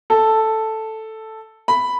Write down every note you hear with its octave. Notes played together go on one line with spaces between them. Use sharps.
A4
B5